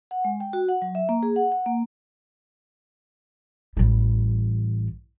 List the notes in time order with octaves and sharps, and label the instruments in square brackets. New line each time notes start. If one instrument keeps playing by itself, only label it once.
[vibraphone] F#5
G#3
G5
F#4
F#5
F#3
E5
A#3
G#4
F#5
F#5
A#3
[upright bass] A1 G3